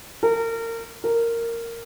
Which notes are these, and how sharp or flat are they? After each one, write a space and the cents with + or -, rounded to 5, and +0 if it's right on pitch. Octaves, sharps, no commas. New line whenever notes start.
A#4 -30
A#4 -10